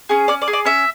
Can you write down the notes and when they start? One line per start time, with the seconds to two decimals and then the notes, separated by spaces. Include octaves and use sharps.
0.09 C#4 G#4
0.28 C#4 D5
0.42 D5
0.48 G#4
0.53 D5
0.65 C#4 E5